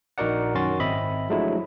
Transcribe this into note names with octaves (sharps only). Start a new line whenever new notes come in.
A#1 D#4 F#4 A#4 D5 F#5
F#2 D#3 C#4 F#4 C6 A6
G#1 C4 D#5 E5 B5
F3 F#3 G#3 A3 D4 E4